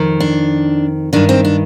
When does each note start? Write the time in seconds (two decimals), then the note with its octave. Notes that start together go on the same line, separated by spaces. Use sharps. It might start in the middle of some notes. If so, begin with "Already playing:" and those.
Already playing: F2 D#3
0.20 D4
1.13 G2 D#3 D4
1.29 C4
1.45 D4